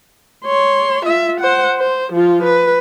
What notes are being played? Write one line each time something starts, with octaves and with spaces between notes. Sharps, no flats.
C#5 C6
F4 E5
C5 F#5
C5
F3 F4
B4